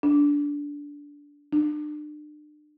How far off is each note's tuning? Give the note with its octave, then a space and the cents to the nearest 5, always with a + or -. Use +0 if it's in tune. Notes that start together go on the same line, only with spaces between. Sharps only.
D4 -15
D4 +35